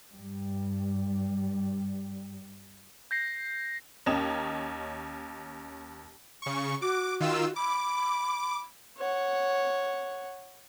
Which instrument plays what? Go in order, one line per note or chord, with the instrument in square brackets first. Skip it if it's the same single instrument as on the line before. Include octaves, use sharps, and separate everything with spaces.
[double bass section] G2 G3
[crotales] G6 A#6 C7
[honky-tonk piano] D#2 C#4 D#5 A#5 D#6 E7
[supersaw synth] C#3 C#6
[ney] F#4 [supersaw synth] D6
[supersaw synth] D#3 F4 E6
[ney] B5 [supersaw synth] D6
[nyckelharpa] C#5 F#5